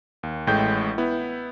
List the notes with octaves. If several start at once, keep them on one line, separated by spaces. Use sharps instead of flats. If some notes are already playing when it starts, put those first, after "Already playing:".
D#2
A1 A2 G#3 G5 G6
B3 E4